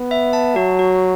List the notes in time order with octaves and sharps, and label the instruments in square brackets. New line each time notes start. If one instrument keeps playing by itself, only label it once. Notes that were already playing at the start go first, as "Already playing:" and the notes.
Already playing: [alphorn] B3
[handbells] E5
A5
[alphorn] F#3 [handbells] F#4
[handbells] F#4